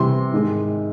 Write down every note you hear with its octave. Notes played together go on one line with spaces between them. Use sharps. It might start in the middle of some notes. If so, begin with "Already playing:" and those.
Already playing: C3 E3 G3 C6
G#2 D#3 G#3